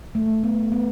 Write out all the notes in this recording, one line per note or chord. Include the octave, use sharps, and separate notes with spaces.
A3
B3
B3